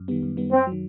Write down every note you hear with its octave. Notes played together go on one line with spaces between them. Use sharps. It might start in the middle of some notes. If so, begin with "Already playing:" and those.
Already playing: F#2
D#3 G3 B3
F#2
D#3 G3 B3
F#2 C4
F#3
D#3